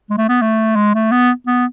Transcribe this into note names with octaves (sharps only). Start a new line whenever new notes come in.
G#3
A3
B3
A3
G#3
A3
B3
B3